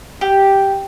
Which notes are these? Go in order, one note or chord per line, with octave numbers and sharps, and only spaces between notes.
G4